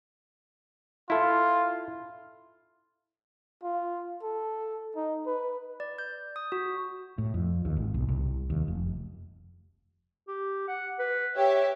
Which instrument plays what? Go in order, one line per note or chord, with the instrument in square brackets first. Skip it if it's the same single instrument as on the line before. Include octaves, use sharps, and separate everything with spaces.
[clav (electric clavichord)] E4 A4 [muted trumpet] F4
[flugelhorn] F4
A4
D#4
B4
[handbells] D5
G6
D#6
F#4
[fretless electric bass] A2
F2
D#2
G#1
B1
C2
D#2
F1
[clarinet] G4
F#5
B4
[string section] G4 E5 [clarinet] C#5